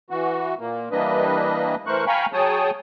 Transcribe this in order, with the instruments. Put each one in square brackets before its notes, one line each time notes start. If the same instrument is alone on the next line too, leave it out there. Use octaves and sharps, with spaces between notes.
[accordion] E3 F#4
A#2 A#3
E3 G3 A#3 D4 B4 D#5
E3 A3 A#4 C5 C#6 F#6
F5 G5 G#5 A#5 B5 C#6
F#3 G#4 C#5 G5 A5 D#6